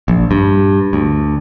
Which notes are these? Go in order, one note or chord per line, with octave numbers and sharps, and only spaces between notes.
A#1
G2
D2